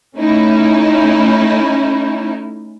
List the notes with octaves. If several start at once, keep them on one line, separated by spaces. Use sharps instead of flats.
A3 C#4 D#4 E4